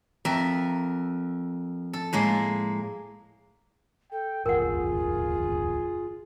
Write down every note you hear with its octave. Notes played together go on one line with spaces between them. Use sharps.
F2 A#4 E5
A4
A2 G#3 A#3
A4 G5
D1 G1 E2 F4 G#4 A#4 F#5